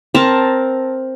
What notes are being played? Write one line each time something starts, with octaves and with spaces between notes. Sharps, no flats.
C4 A#4 A5